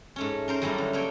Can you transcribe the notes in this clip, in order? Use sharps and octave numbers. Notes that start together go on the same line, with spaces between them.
G#2 A3 C#4
C#4 A#4 C5
F#2 E3 G3 A3 A#3 C#4
D3
A3 A#3 C#5 G5